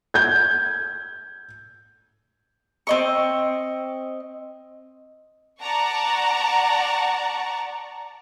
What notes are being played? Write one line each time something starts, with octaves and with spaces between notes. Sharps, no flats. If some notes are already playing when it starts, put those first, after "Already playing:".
G6 G#6
C4 D#5 C#6
D5 F#5 A5 A#5 C#6